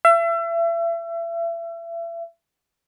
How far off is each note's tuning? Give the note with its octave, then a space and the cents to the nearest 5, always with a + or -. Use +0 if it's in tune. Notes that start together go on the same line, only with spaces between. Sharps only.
E5 +35